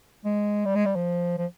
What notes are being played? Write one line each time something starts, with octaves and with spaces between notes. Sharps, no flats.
G#3
G3
G#3
G3
F3
F3